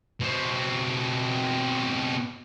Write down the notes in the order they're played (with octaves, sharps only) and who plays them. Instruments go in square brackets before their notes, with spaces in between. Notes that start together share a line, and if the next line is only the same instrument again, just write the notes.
[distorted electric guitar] B2 C4